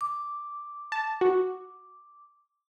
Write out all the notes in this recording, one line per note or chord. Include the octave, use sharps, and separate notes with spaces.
D6
A5
F#4